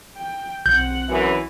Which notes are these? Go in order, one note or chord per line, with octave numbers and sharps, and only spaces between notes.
G5
B1 C4 F#5 G6
F#2 E3